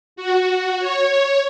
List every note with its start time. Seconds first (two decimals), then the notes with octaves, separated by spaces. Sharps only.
0.16 F#4
0.79 C#5